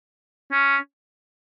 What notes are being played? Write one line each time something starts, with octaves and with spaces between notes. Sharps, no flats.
C#4